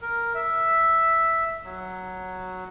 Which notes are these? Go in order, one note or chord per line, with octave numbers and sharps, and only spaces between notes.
A#4
E5
F#3